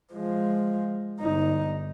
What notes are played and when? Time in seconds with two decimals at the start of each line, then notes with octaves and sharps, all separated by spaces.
0.13 F3 G#3
1.20 G1 D#4